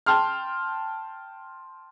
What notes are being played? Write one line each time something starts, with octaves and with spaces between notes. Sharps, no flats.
G5 A5 C6 F6